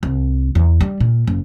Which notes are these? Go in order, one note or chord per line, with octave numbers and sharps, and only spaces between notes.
C2
E2
G3
A#2
F#1